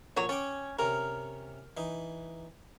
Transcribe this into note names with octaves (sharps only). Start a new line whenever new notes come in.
A#1 F#3 C#5
C#4 C#5 G5 D6
C3 C#4 A#4
E3 D#4